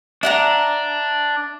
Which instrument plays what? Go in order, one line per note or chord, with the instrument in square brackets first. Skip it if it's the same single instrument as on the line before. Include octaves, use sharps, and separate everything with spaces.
[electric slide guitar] D4 [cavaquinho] E5 F#5 A#5